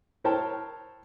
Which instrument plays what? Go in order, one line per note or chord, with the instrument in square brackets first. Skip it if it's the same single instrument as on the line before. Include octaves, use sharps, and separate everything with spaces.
[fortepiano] E4 A#4 C5 C#5 G5 A5